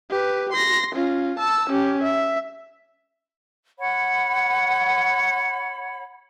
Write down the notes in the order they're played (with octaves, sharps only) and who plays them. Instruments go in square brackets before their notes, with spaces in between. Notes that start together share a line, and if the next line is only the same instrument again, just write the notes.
[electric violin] G4 B4
C6 A#6
C#4 F4
A5 E6
C#4 G4
E5
[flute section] C#5 F#5 B5